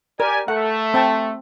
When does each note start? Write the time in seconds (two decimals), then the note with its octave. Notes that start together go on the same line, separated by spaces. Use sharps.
0.20 G4 A#4 D5 G#5
0.48 A3 F#5
0.94 C4 G5 A5